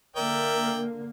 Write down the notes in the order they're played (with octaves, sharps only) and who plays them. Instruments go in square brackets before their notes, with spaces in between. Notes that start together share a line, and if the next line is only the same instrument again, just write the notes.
[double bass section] D3 A#3 [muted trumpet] A#4 [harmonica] D5 E5 G5